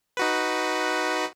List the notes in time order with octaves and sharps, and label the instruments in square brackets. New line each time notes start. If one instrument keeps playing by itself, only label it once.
[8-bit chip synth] D#4 F#4 B4